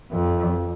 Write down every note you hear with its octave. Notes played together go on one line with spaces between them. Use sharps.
F2